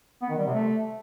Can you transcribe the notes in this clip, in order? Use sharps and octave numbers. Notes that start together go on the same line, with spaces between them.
B3
D#3
G3
C3
A3